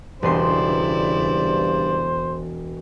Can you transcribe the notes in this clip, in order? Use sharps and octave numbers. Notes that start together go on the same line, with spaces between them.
E1 G2 C#3 B3 E4 C5 D5 C6